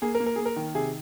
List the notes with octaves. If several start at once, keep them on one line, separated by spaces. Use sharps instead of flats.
A#3 G#4
A#4
A#3
A#4
A#3 G#4
A#4
D#3
C3 G#4